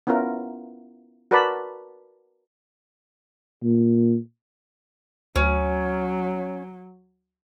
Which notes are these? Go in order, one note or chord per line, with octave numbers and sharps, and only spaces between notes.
B3 C#4 E4 F4 A#4
F#4 A#4 B4 D5 A5 B5
A#2
D2 F#3 C#4